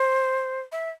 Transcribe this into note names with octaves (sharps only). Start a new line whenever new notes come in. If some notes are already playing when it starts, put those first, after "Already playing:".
Already playing: C5
E5